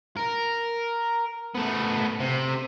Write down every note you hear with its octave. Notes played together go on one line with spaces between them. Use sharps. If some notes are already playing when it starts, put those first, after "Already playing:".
A#4
A3 B3
C3